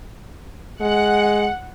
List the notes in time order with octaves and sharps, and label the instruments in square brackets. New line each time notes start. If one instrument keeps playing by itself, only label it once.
[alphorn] G#3 [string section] F#5